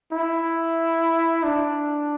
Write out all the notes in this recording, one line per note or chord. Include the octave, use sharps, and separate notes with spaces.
E4
D4